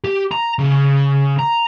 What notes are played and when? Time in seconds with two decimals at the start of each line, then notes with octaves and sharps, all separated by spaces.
0.04 G4
0.31 A#5
0.59 C#3
1.39 A#5